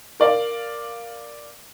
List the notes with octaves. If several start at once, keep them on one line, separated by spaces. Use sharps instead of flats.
A#4 D5 F5